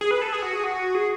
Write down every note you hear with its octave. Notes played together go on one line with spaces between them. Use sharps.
G#4
B4
A4
G#4
F#4
G#4
F#4
G#4